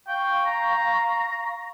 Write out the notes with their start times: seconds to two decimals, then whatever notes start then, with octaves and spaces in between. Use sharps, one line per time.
0.07 F5 G5 C#6
0.45 A#5